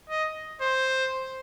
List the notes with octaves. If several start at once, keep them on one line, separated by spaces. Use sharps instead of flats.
D#5
C5